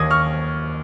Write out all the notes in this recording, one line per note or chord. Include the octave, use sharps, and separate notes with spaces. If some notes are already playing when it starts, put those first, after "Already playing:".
Already playing: D#2 A#3 D#6 G#6 A#6
C#6 F6